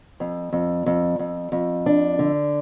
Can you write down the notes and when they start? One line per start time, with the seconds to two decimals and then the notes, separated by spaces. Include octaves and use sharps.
0.20 F2
0.53 F2
0.86 F2
1.19 F2
1.52 F2
1.86 D4
2.19 D3